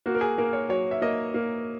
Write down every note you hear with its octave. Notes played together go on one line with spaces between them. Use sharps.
A#3 F#4
A#4
G#4
A#3 A#4
C#5
F#3 C#5
E5
A#3 D#5
A#3